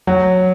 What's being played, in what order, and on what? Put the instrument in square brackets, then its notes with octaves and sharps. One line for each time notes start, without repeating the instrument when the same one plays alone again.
[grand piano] F#3